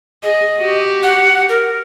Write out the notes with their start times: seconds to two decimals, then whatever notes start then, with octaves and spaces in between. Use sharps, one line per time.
0.23 G#4 D#5
0.58 F#4 G4
1.03 F#5
1.49 A#4